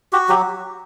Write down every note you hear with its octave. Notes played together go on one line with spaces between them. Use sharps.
F#4 G4
F#3 G4